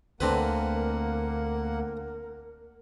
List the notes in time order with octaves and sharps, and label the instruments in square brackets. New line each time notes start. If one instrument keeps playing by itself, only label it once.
[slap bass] D2 [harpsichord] D3 C4 B4 [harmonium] A#3 F#5 [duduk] A#4